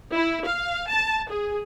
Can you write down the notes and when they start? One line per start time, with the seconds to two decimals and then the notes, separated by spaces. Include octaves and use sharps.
0.13 E4
0.46 F5
0.89 A5
1.30 G#4